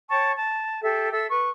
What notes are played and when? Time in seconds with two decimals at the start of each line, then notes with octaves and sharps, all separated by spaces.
0.09 C#5 G5 A5 C#6
0.36 A5
0.83 G4 A4 E5
1.12 A4 E5 E6
1.31 B4 C#6